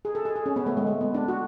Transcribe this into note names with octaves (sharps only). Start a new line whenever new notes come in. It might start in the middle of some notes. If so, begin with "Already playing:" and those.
G#4
A4
G#4
G#4
C#4
B3
A3
G#3
A3
B3
D4
F#4